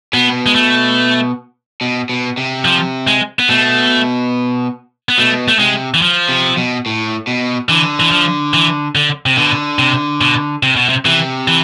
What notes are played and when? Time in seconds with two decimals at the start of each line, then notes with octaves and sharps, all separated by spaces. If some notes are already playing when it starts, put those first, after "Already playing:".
0.13 B2 B3
0.46 G#3
0.55 A3
1.81 B2
2.09 B2
2.37 C3
2.65 F3
3.07 G#3
3.39 B3
3.49 B2 A3
5.09 B3
5.18 B2 A3
5.48 A3
5.59 C3 G#3
5.94 E3
6.02 F3
6.29 C3
6.57 B2
6.86 A2
7.27 B2
7.69 D3 E3
8.00 E3
8.11 F3
8.54 E3
8.95 D3
9.26 C3
9.37 B2 D3
9.79 C3
10.21 B2
10.63 C3
10.76 B2
10.89 C3
11.05 C3 E3
11.48 E3